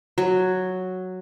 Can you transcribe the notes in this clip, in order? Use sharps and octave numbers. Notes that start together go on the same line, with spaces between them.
F#3